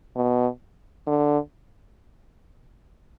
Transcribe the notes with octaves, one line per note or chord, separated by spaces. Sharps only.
B2
D3